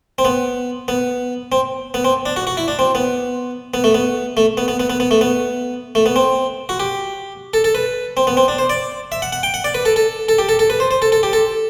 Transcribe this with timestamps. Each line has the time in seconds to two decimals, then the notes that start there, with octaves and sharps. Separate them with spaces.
0.18 C4
0.25 B3
0.88 B3
1.52 C4
1.94 B3
2.04 C4
2.26 D4
2.36 F#4
2.47 F#4
2.57 E4
2.68 D4
2.79 C4
2.95 B3
3.74 B3
3.84 A3
3.94 B3
4.37 A3
4.57 B3
4.68 B3
4.80 B3
4.90 B3
5.00 B3
5.11 A3
5.21 B3
5.95 A3
6.06 B3
6.16 C4
6.69 F#4
6.80 G4
7.54 A4
7.64 A4
7.75 B4
8.17 C4
8.27 B3
8.37 C4
8.48 D4
8.58 C5
8.70 D5
9.12 E5
9.22 F#5
9.32 F#5
9.43 G5
9.54 F#5
9.64 D5
9.75 B4
9.85 A4
9.96 A4
10.29 A4
10.38 G4
10.49 A4
10.59 A4
10.70 B4
10.80 C5
10.91 C5
11.02 A4
11.12 A4
11.23 G4
11.33 A4